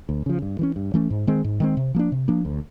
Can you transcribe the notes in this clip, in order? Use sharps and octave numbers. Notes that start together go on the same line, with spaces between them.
D2
C#3 F3
G2
E3 A3 C#4
G2
E3 A3 C#4
G#2
D#3 G#3 C4
G#2
D#3 G#3 C4
C3
F3 A#3 D4
C3
F3 A#3 D4
D2